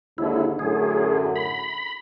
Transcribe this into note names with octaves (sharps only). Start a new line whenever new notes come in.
D#2 G#2 D3 E4
F#2 A2 D3 G#4
B5